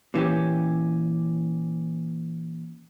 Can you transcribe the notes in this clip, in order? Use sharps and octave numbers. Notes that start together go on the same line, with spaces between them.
A#2 E3 C#4 G4